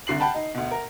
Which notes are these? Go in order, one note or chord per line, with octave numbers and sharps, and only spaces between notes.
C2 D3 C7 F#7
F#5 G5 A5 B5
D#4
D2 B2
A#4